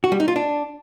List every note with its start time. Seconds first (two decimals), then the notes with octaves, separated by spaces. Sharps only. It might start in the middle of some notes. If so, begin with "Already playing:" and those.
0.04 F#4
0.12 G3
0.20 D#4
0.28 F4
0.36 D4